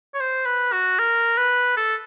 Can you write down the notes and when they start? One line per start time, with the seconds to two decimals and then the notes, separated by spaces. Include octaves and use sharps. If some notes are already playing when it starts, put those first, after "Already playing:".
0.14 C#5
0.20 C5
0.46 B4
0.72 F#4
0.99 A#4
1.38 B4
1.77 A4